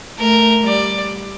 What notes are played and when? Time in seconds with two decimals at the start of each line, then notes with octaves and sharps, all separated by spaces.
0.19 A3 A#4
0.66 G3 D5